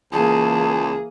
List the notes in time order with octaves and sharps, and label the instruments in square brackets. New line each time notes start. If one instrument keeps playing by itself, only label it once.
[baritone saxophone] C#2 [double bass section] E3 A#3 [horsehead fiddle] G#4 [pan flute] A5